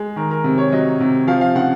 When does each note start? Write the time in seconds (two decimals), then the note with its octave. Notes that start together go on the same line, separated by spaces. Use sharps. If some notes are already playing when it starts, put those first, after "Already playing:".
Already playing: G#3
0.16 D#3 A#4
0.31 A#4
0.44 C3
0.58 C#5
0.72 F#3 D#5
1.00 C3
1.27 F3 F5
1.41 F5
1.56 C#3 F#5